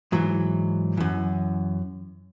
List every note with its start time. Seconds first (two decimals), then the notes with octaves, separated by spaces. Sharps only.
0.12 G#2 E3 F#3
0.97 F#2 E3